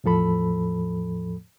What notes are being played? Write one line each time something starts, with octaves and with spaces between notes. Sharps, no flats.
E2 A2 F3 A4 B5